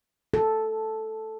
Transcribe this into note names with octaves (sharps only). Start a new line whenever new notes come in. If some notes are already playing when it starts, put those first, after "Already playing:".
A4